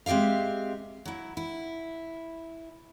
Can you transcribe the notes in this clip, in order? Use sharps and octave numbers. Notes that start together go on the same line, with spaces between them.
G#3 C4 G4 E5 F5
F#3 E4
E4